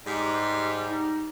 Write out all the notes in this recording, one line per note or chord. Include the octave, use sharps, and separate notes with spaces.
G#2 G3 G4
D#4